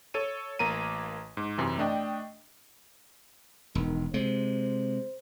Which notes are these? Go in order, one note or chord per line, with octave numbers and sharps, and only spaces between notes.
A4 C#5 D#7
A1 A#3 A#5 D#7
G#2
F#2 C3 E3
A3 D4 D#5 G5
E1 D#3
C3 G#3 C5